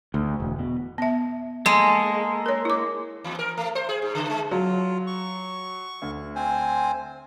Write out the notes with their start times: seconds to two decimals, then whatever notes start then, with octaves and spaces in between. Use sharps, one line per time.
0.14 D2
0.40 E1
0.59 B2
0.98 B3 E5
1.66 G#3 A#3 A4
2.46 A#4 C#5
2.65 E4 D6
3.24 E2
3.39 A#4
3.57 A3
3.75 C5
3.89 G#4
4.02 G#2
4.15 C#3
4.30 G#3
4.51 F#3 F4
5.07 C#6
6.02 D2
6.36 C4 C5 G#5